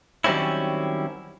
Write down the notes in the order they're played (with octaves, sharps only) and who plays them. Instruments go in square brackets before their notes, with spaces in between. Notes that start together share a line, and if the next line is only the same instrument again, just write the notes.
[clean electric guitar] D#3 F#3 G3 C4 C#4 E4